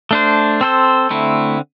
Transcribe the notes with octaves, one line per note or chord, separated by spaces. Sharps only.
A3 D4 C5
C4 A4 C5
D3 A3 C4 E4